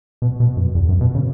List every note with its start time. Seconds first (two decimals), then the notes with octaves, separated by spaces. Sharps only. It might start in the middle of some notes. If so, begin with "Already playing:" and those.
0.22 B2
0.40 B2
0.57 F#2
0.75 E2
0.89 F#2
1.01 B2
1.15 C#3